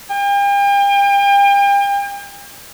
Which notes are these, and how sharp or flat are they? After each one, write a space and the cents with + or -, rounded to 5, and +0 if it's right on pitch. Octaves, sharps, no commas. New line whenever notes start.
G5 +40